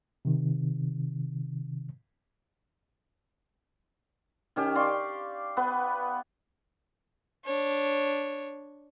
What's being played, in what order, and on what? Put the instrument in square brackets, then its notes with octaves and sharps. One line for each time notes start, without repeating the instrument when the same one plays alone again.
[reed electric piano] C3 D#3
[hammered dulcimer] D#3 C#4 G4
D5 F5 C6 C#6
B3 B4
[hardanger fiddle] D4 C#5